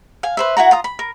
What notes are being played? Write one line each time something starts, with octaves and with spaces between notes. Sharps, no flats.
F5 G#5
B4 C5 E5
E4 F#4 F#5 A#5
F4 A#5 D#6
B5
A#4